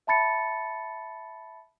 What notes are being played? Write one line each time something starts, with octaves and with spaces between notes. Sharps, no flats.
E5 A5 B5 A6 C#7